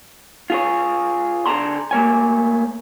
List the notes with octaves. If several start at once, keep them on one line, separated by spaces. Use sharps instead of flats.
F4 G#4 C#5
D3 G#4 D5 A5 A#5 C6
A3 A#3 C#5 G#5